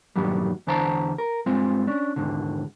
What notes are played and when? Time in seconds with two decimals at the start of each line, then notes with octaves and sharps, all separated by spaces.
0.16 G2 A#2 D#3 F#3 G3
0.67 E2 D3 C5 A5 A#5
1.18 A#4
1.46 G2 G#3 C4 F4
1.87 C#4 D4
2.16 D#2 G#2 D3